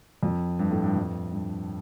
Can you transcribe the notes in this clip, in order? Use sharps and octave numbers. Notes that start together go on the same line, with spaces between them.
F2
G2
A2
G2
F2
G2